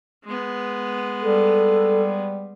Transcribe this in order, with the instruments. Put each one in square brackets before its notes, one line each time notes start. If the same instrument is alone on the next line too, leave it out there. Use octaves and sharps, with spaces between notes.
[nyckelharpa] G#3 B3
[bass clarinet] G3 [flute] A4